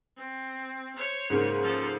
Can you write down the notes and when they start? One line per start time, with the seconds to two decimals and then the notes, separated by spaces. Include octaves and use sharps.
0.16 C4
0.96 C5 C#5
1.30 G#2 C#3 A#3
1.62 F3 A4